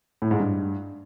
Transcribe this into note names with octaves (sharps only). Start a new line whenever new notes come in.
A2
G#2
G2